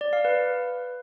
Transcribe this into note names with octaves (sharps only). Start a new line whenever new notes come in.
D5
F5
B4